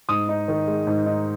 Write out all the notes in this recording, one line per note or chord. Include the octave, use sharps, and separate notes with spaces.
G#2 D#6
D#4
D#3
G#3
G#2
D#4